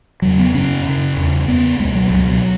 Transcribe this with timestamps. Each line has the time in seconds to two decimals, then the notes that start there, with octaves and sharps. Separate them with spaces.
0.22 E2 C#3 F#3
0.39 B3
0.54 F#2 C#3 C#4
0.85 F#2 C#3
1.17 E2 C#3
1.48 E2 C#3 B3
1.79 C#2 B2 G#3
1.95 F#3
2.10 C#2 B2 F#3